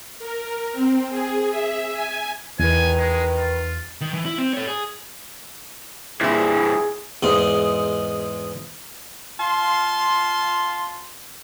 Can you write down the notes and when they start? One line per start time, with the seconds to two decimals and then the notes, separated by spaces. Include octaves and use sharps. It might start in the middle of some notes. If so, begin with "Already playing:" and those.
0.19 A#4
0.73 C4
1.10 G#4
1.51 E5
1.94 G#5
2.59 E2 D#3 B4 G#5
2.98 G#3
3.37 F4
4.01 D#3
4.14 E3
4.26 E4
4.38 C4
4.53 A4 C#5
4.68 G#4
6.21 G2 A#2 E3 E4 G#4
7.23 E2 G#2 G#3
9.39 F4 F5 A5 C6